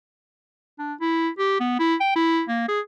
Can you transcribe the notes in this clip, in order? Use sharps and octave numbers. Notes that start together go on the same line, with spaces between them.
D4
E4
G4
B3
E4
G5
E4
A#3
G#4